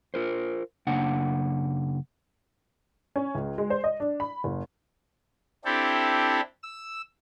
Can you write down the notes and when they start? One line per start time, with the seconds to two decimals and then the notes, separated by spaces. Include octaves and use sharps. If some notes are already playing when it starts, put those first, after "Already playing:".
0.14 F4 A#4 C5
0.87 F#2 C#3 A#3 D4 F#5
3.16 C#4
3.35 C#2
3.58 G#3
3.70 C5
3.84 D#5
4.00 D4
4.20 B5
4.44 F#1
5.65 C4 D4 E4 G4 A4
6.63 E6